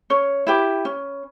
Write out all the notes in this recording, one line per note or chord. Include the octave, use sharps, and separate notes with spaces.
C#4 C#5
E4 G4 B4
C#4